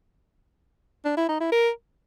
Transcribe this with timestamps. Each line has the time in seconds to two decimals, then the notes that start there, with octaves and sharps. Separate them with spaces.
1.05 D4
1.17 E4
1.28 D#4
1.40 E4
1.52 A#4